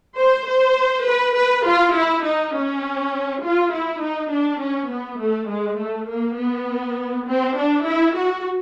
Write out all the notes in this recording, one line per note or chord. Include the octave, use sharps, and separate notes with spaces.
C5
C5
B4
B4
F4
E4
D#4
C#4
F4
E4
D#4
D4
C#4
B3
A3
G#3
A3
A#3
B3
C4
D4
E4
F#4